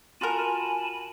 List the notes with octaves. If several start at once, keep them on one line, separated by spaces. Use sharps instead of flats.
F4 F#4 A#4 G#5 A5 B5